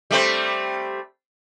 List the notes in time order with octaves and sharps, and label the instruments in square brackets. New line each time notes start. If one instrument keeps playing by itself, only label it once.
[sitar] G3 A3 C4